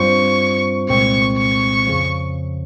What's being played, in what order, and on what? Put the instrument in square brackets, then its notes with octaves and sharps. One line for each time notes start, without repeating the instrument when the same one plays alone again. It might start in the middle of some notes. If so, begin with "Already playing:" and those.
Already playing: [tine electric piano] G2 G3 C4 F4 C5 [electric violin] C#6
[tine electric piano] C2 A#2 G#3 C4 [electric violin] C#6
[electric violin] C#6
[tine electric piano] F2 C#3 F3